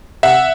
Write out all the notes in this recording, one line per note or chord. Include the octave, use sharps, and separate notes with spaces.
C3 E5 F#5